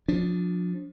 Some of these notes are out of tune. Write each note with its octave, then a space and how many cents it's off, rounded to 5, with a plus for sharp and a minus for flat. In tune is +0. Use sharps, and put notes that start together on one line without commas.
F3 +35 D4 -10